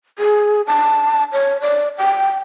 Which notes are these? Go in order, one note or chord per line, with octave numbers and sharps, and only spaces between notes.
G#4
A5
C#5
D5
G5